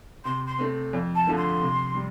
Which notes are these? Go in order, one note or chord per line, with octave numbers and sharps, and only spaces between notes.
C3 C6
C6
A3 C4
F2
A5
D3 F3 A3
C6
C3
G3